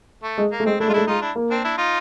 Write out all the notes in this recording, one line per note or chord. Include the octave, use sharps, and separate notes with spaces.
A3
G#3
A#3
A3
G#3 C4
A3 D4 E4
G#3 F4
A3 D4 E4
G#3 D#4 F4
D4 E4
A#3
C4 D4
D4 E4
D#4 F4